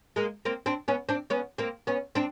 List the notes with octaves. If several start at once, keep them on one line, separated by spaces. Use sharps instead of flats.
G#3 A#3
A#3 C4
C4 D4
B3 C#4
C4 D4
B3 C#4
A#3 C4
B3 C#4
C4 D4